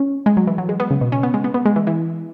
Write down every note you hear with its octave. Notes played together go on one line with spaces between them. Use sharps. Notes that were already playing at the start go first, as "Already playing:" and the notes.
Already playing: C#4
G#3
F#3
E3
F#3
G#3
B3
C#3
B2
C#4
B3
G#3
B3
B3
G#3
E3
E3